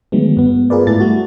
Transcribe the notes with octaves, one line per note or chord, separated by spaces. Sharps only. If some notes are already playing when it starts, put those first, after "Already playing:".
D3 D#3 F#3 G#3 A3 B3
G2 B3
F4 G#4 A#4 B4 D5
G#2 A3 E4 A4 A6
G3 A3 F#4